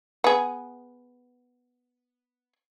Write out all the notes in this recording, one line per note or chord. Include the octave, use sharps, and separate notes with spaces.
B3 G#4